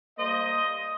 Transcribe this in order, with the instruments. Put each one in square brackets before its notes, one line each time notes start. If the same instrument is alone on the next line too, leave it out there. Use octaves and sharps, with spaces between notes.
[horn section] G3 A#3 C5 D#5